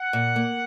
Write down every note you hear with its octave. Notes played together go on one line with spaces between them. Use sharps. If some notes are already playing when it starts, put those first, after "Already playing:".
Already playing: F#5
A#2
A#3